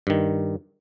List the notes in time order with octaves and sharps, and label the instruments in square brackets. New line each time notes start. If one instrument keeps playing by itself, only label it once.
[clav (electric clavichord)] G2 D#3